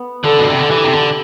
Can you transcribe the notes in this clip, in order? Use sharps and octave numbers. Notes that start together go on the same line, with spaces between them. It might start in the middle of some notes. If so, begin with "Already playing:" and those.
Already playing: B3
D3 A4
B2
C3
D3
E3 G4
C3
D3